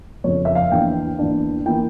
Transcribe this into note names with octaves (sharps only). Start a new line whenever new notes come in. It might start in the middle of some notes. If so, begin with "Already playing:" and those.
F2 C#3 F3 C#5
E5
F5
E2 E3 A#3 D4 G5
E2 E3 A#3 D4
E3 A#3 E4 G5